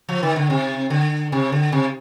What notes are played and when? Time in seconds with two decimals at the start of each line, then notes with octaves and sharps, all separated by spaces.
0.09 F3
0.23 D#3
0.36 D3
0.50 C3
0.90 D3
1.32 C3
1.52 D3
1.72 C3